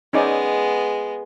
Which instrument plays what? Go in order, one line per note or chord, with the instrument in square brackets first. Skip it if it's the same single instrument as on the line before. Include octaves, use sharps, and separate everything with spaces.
[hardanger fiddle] G#3 B3 [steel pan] C#4 D#4 D5